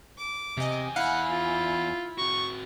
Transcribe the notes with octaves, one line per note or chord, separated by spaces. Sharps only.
D6
E2 C3 D#5 G#5
E4 F5 F#5
F4
C4 F#4 C#6